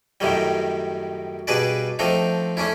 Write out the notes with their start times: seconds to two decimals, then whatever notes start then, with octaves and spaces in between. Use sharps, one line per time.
0.21 F#2 A2 D#3 F#3 G3
1.47 G2 B2 D4 G#4 B4 D5
1.99 F3 A3 C4 D4 D#4
2.57 A3 C#4 D4 E4